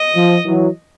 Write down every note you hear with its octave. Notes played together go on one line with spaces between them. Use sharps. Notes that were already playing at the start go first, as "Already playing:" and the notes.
Already playing: D#5
F3
E3 F#3